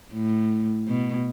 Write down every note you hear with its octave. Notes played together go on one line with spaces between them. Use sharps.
A2
B2